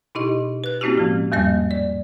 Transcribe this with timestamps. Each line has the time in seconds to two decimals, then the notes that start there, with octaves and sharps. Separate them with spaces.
0.15 B2 D#4 E4 G4 D#5
0.64 B4 F#6
0.81 A#3 C4 C#4 E4 F#4 G4
0.95 A2 F3 G#3
1.32 E2 G#2 G3 A#3 D#5 A#6
1.71 D5